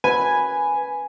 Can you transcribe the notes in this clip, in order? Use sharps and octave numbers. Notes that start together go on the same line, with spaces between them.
B4 G#5 B5